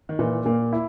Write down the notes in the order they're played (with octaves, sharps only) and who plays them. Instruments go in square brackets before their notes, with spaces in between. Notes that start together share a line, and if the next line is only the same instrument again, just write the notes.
[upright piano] D#3
[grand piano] A#2 [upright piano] E3
[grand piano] A#2 [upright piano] A#3
[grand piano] E4